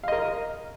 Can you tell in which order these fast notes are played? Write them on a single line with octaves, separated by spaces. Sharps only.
F5 D#5 A#4